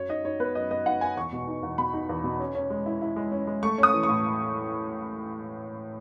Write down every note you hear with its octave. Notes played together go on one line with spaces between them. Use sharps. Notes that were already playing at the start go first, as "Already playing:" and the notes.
Already playing: F#2 F#3 C#5
D#4 D#5
D#4 C#5
B3 B4
F#2 D#5
B3 D#5
D#4 F#5
B3 G#5
E2 C#6
B2
D#4
E2
B2 B5
D#4
E2
B2
C#4
C#4
G#3
E4
E4
G#3
C#4
G#3
A3 C#6
C#4 D#6
E3
C#6
A2